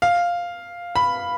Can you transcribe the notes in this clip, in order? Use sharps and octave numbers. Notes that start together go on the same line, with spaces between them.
F5
B5